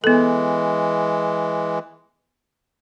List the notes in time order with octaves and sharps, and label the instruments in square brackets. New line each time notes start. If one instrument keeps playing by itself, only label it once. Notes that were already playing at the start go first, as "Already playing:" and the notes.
[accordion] E3 G#3 [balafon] B3 A4